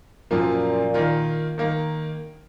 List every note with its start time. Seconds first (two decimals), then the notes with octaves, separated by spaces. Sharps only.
0.31 F#2 A#2 F3 A#3
0.94 D#3 A#3 F4
1.58 D#3 A#3